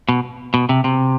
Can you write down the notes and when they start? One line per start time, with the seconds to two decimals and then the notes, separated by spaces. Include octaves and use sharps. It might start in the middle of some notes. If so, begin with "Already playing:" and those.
0.09 B2
0.54 B2
0.69 C3
0.84 C3